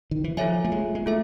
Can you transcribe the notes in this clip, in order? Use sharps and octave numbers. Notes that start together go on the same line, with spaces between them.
D#3
E3
F3 F4 A4 C#5 E5 G#5
A3
G#3
G#3
A3 F4 A4 E5